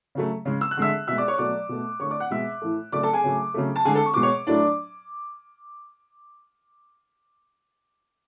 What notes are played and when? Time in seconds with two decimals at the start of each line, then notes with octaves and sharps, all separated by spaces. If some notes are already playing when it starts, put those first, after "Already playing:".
0.15 C#3 F#3 A3
0.45 C#3 G#3
0.61 E6
0.71 F#6
0.77 D3 G#3 E5 E6
1.07 B2 G#3 E5 E6
1.18 D5 D6
1.28 C#5 C#6
1.38 B2 F#3 A3 D5 D6
1.69 B2 A3
2.00 D3 A3 C#5 C#6
2.11 D5 D6
2.20 F#5 F#6
2.31 B2 G#3 E5 E6
2.62 A2 E3 A3
2.92 C#3 F#3 A3 D5 D6
3.03 A4 A5
3.13 G#4 G#5
3.24 C#3 F#3 A3
3.54 C#3 F#3 A3
3.76 A5
3.85 D3 G#3 G#4 G#5
3.95 A4 A5
4.06 C#6
4.14 B2 G#3 D6
4.22 C#5 C#6
4.47 A2 F#3 A3 D4 D5